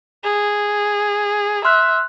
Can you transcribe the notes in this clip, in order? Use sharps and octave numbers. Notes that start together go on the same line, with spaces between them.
G#4
E5 C6 F6 F#6